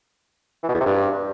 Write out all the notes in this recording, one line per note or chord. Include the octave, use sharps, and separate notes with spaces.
E3
B2
E2
C3
G2